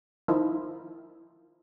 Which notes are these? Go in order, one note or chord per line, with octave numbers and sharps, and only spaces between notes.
D#3 F3 D#4 E4